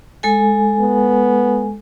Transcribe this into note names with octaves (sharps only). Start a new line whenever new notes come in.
G#3 A4 G#5
B3